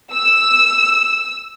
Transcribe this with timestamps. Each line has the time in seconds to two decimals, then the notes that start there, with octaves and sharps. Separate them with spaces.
0.14 E6